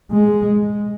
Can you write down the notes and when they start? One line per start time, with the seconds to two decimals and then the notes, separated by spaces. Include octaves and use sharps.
0.12 G#3